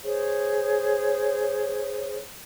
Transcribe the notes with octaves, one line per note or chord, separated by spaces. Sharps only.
G#4 C5 C#5